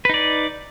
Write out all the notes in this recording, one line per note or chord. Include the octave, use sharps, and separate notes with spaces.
D#4 B4 D5